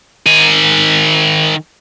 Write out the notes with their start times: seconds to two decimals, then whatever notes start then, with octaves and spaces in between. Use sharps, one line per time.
0.26 D#3 G#5